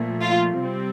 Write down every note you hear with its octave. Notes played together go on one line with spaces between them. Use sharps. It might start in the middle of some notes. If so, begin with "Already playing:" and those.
Already playing: A#2 F3 A3
F4
C3 G3 C4